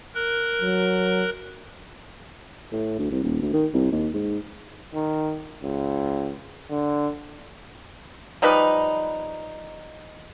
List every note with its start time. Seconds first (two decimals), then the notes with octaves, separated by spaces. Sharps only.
0.15 A#4 F#6
0.61 F#3
2.72 A2
2.99 D2
3.11 C2
3.23 D#1
3.42 D2
3.53 D#3
3.74 C2
3.92 D#2
4.14 G#2
4.94 D#3
5.63 C#2
6.70 D3
8.42 F3 G3 D#4 B4